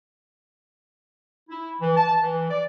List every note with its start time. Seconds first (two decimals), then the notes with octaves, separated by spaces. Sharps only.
1.50 E4
1.81 E3
1.97 A5
2.22 E3
2.50 D5